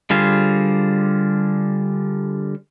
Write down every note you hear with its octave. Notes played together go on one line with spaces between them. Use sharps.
D3 G3 F4 G#4 C5